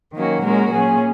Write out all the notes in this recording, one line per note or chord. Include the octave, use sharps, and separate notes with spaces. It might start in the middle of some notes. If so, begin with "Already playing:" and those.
D#3 F#3 A#3 C#4 F#4
A#2 G#3 C#4 F#4 A#4
A#2 F#3 C#4 G#4